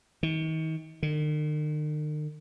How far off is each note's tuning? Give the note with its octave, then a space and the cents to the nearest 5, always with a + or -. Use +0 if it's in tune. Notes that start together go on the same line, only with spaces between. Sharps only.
D#3 +40
D#3 -45